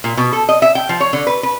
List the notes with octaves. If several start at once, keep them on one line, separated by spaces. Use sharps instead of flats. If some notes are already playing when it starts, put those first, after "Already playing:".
A#2
B2
A4
D#5
E5
G5
F3
C#5
D3
B4
B4